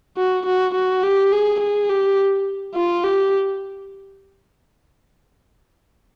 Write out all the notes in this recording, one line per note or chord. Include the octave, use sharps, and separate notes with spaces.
F#4
F#4
F#4
G4
G#4
G#4
G4
F4
G4